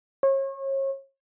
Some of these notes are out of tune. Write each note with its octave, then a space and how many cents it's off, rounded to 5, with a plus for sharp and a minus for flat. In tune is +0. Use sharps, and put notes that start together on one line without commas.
C#5 -35